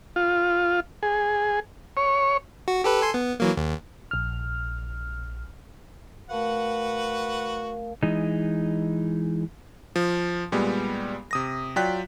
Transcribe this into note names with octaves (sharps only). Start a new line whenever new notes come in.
F4
G#4
C#5
F#4
G4 A4 B4
A4 G#5 C6
B3
E3 F#3 A#3
D#2
A#1 F6
A3 F#4 A#4 B4 F5 F#5
E3 G#3 D#4
F3
A#2 G3 G#3 B3
C3 D#6 A#6
F#3 F4 D5 G5 F#6 B6